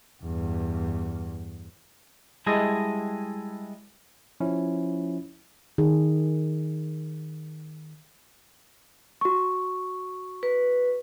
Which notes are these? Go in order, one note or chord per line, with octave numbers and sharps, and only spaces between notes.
E2 G2
G3 G#3 E4 G#4 A4 D#5
F3 C#4 E4
D#3 G#4
F#4 C#6
B4